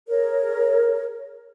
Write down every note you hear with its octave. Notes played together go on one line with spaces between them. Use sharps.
G#4 A#4 C#5